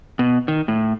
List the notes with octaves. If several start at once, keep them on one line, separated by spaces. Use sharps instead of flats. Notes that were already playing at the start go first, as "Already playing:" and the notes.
B2
D#3
A2